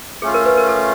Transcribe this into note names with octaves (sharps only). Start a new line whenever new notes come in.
A3 C#4 F4 G#4
A#4
B4
A#4
A4